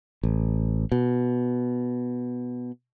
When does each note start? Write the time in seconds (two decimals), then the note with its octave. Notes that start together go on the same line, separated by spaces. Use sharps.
0.23 A1
0.92 B2